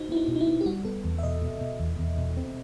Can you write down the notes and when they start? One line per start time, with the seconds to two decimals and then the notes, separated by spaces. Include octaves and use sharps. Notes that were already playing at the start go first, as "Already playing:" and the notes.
Already playing: D#4 F#4 C5
0.09 B3 E4
0.16 D#4
0.28 B2
0.36 D#4
0.41 E4
0.47 B3
0.61 G4
0.66 G3 F#4
0.85 B3 A4
1.04 E2
1.18 E5
1.23 B2 D#5
1.42 B2
1.61 B2
1.80 E2
1.99 E2
2.18 B2
2.37 C4